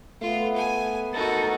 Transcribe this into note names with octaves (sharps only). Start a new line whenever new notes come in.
A3 B3 F4
G#5
D#4 F#4 A4 A#4